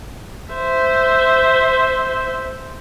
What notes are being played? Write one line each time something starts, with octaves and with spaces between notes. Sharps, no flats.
C5 E5